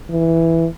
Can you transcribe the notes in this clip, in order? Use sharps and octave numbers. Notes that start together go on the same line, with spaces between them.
E3